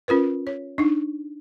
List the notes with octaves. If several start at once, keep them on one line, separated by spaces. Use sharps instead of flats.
C#4 F4 A#4 B4
C#5
D4 D#4